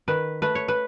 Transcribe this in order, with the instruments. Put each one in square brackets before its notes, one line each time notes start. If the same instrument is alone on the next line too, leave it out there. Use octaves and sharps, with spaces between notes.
[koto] D#3 B4
A3 B4
C#5
B4